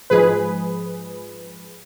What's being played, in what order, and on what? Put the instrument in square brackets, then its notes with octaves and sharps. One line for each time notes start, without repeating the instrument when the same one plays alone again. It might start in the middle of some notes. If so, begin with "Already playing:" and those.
[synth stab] G#2 F3 G#3 G#4 B4